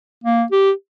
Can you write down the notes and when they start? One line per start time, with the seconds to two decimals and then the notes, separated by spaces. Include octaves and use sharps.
0.24 A#3
0.52 G4